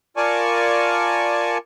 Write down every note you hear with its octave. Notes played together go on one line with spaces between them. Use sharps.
F4 A#4 D5 G#5 A5 C#6